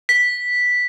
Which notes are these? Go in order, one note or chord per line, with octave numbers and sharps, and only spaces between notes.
B6